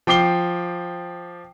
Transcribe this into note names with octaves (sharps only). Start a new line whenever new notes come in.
F3 G5 D6 C7 G7